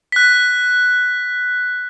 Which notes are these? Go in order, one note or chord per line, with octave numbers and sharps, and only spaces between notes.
F#6 B6